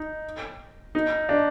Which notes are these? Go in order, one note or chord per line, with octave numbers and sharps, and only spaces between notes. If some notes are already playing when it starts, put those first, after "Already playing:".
Already playing: D#4
D#4
D4